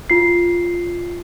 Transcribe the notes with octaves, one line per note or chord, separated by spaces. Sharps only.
F4 C7